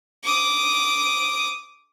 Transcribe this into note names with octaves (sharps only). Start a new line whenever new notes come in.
D6 D#6